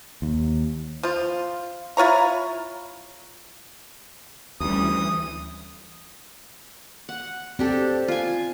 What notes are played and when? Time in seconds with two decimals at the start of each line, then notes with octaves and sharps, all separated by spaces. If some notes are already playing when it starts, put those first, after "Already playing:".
0.22 D#2
1.03 F3 F4
1.97 E4 F4 C#5 A#5
4.60 D2 E3 G3 C4 C#4 D#6
7.09 F#5
7.59 C4 D4 G4 A4
8.08 F4 G#5